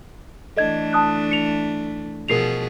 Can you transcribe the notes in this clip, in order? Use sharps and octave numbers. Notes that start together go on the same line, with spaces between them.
E3 A3 D4 A4 D#5 G#6
A5 D#6 F#6
C#7 F7
B2 F3 G#4 A#4 C7 F7